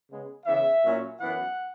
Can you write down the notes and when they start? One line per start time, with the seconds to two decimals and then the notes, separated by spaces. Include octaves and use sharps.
0.09 C#3 G#3 B3
0.45 C#3 E3 B3 E5
0.83 A#2 F#3 C#4 E4
1.20 F#2 E3 B3 E4 F#5